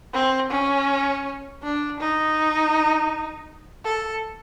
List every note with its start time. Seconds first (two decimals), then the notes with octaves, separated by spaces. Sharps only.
0.13 C4
0.51 C#4
1.63 D4
2.00 D#4
3.85 A4